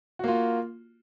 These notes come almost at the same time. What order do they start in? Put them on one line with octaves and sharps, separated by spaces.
F#4 A#3 F4